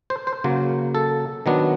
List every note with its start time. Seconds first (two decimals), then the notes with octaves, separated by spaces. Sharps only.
0.10 C5
0.27 C5
0.44 C#3 F#3 A#3
0.95 A4
1.46 D#3 F#3 B3 D4